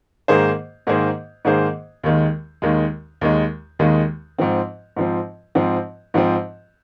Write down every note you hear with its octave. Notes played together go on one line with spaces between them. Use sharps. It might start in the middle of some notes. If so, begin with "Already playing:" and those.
G#2 D#3 A#3 G#4 C5
G#2 D#3 A#3 G#4 C5
G#2 D#3 A#3 G#4 C5
D#2 D#3 G#3
D#2 D#3 G#3
D#2 D#3 G#3
D#2 D#3 G#3
G#2 F3 C4
G#2 F3 C4
G#2 F3 C4
G#2 F3 C4